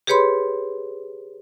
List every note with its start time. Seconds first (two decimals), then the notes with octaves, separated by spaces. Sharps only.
0.07 G4 G#4 B4 C#5 B5 C6